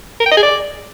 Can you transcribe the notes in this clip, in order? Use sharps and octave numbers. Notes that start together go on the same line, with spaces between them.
A#4
G5
D#5
G#4
D5